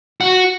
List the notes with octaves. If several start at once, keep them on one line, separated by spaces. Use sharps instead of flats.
F#4